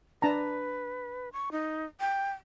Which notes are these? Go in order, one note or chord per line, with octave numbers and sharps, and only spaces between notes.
D4 B4 A5 A#5
C#6
D#4
G5